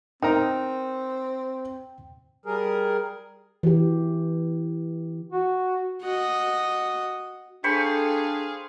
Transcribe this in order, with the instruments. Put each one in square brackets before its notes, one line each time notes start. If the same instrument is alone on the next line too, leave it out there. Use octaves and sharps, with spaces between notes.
[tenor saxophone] C4 [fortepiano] D#4 A#4 A#5 [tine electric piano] G5
[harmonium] G3 G#4 A#4
[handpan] E3 G4
[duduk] F#4
[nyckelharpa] F#4 D#5
[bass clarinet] D4 [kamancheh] G#4 F5 [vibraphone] A4 G5 [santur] C5 B5 C#6